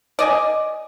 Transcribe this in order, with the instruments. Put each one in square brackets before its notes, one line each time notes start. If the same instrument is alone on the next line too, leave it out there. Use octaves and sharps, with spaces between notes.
[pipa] D5 D#5 G#5